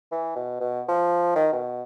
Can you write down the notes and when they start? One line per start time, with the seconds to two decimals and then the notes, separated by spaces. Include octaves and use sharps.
0.12 E3
0.36 B2
0.60 B2
0.89 F3
1.35 D#3
1.53 B2